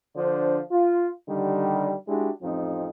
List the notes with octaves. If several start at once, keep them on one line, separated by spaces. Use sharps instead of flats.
D3 F3 D4 C5
F4
D3 D#3 G3
G#3 D4 E4 F#4 G4
A1 F2 F3 C4 D#4